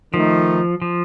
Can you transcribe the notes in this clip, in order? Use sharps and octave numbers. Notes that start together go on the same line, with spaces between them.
D#3 F3 A3 D#4
F3